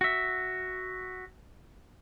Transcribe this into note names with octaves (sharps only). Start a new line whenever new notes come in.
F#4 E5